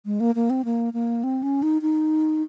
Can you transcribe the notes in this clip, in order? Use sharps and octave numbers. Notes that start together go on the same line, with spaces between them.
G#3
A#3
A#3
C4
A#3
A#3
C4
C#4
D#4
D#4